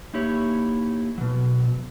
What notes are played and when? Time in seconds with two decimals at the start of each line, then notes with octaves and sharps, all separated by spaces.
0.14 A#3 D#4 E4 G4 C#5
1.18 B2 F#3